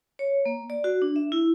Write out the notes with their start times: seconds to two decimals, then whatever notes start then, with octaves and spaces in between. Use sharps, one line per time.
0.19 C#5
0.46 A#3
0.70 D5
0.84 F#4
1.02 D4
1.16 E5
1.32 E4